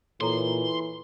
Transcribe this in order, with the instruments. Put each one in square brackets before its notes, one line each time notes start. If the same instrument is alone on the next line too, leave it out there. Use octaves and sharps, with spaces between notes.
[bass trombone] A#2 [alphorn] E3 [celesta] A4 C#5 A#5 [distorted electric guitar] C6